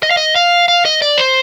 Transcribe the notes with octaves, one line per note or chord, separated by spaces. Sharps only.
D#5
F5
D#5
F5
F5
D#5
D5
C5